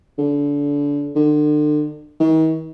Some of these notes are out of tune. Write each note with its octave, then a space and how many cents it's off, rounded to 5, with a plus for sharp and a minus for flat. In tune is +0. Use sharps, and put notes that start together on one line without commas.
D3 -30
D3 +35
D#3 +45